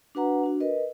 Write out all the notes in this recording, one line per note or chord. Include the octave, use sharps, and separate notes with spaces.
D4 F#4 B4 F#5 A#5
D4 F#4
A#4 B4 D#5